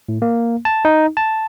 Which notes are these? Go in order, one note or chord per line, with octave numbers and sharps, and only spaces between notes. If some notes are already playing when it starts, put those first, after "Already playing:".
A2
A#3
A5
D#4
A5